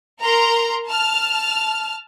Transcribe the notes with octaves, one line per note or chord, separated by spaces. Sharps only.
A#4 A#5 C6
A5 F6